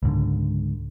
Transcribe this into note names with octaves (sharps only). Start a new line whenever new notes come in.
C#2 G#2 D3